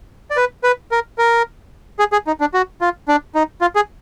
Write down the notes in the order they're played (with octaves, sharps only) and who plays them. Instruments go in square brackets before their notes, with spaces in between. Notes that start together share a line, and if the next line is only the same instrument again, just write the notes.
[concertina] D5
B4
B4
A#4
A#4
G#4
G#4
D#4
D4
F#4
F4
D4
D#4
F4
G#4